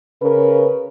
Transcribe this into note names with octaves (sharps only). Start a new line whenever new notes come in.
C#3 A#4 B4